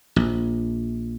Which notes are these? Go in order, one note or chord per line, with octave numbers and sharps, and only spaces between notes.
A#1